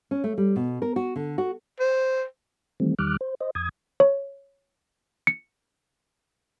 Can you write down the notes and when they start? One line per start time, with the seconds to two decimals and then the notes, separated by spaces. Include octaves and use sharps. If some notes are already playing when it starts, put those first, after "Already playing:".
0.11 C#4
0.24 A3
0.38 G3
0.56 B2
0.82 A#4
0.96 F#4
1.16 D3
1.38 F#4
1.80 C5
2.80 D#3 E3 G3 A3 C4
2.99 E2 D#3 G3 D6 F6 F#6
3.21 C5
3.41 C5 D#5
3.55 F2 D#6 G#6
4.00 C#5
5.27 C#7